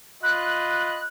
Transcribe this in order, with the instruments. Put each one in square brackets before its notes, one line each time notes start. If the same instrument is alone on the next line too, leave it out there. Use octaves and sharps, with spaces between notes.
[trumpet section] F4 D#5 B5 [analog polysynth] F#6